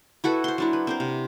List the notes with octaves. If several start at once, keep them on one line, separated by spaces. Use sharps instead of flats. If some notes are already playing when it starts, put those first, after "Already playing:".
E4 F#4 A4 B4
C5 C6
F#3 D4 E4
B4
C4 A#4 C5
C3